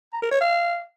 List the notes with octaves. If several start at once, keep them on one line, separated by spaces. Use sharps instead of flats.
A#5
A#4
C#5
F5